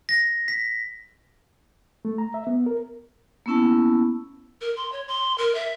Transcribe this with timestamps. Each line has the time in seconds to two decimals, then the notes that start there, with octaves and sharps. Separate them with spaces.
0.09 A#6
0.48 B6
2.05 A3
2.18 A#5
2.34 E5
2.47 B3
2.66 A#4
3.46 A#3 B3 C#4 E4 A5
4.61 A#4
4.76 C6
4.92 C#5
5.08 C6
5.38 A#4
5.55 E5